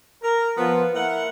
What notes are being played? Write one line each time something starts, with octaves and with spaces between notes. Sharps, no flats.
A#4
F3 B3 F4
A#3 E4 A#4 F#5